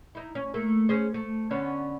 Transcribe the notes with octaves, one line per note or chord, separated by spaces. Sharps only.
D#4 E4
C#4
A3 A#3
C#4 G#4 C5
A3
D3 B3 C#4